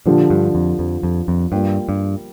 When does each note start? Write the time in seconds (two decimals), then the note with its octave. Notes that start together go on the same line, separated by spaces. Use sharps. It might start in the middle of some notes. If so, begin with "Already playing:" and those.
0.06 A#2 D3 F3 D4 G4
0.30 G2
0.55 F2
0.79 F2
1.03 F2
1.28 F2
1.52 G2 G3 A#3 F4
1.89 G2